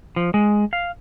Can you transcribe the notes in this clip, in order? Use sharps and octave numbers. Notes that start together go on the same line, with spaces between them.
F3
G#3
F5